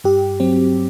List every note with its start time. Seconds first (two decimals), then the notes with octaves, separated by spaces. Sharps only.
0.04 G2 G4
0.40 F#3 C4